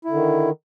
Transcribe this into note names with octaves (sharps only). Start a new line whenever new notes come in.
D3 D#3 E4